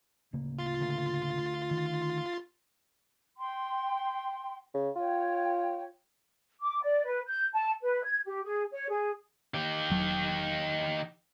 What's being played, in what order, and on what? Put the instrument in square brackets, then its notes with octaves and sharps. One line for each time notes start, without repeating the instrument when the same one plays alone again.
[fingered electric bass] D1 C#3 A#3
[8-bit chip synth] F4 C6 A6
[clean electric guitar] D2
[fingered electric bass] D#3
[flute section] G5 C6
[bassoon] C#3
[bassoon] F4 [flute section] C#5 G5
[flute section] D6
D5
B4
G6
A5
B4
G#6
G4
G#4
C#5
G#4
[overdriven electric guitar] D#3 G4
[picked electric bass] E1 F#3